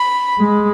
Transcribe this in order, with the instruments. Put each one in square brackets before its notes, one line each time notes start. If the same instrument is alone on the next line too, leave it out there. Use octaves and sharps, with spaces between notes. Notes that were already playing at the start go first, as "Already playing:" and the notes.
Already playing: [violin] B5
[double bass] G#3